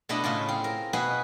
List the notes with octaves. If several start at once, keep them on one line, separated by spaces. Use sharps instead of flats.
B2 A3 D4 E4 D#5 B5
A2 C#3 E4 F4
C4
A#4
B2 E4 F#4 G#4 B4 G#5